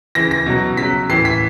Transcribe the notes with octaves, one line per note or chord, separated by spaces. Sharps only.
C#3 E3 A#6
A#6
B2 F#3
C#3 F#3 B6
A2 E3 C7
B6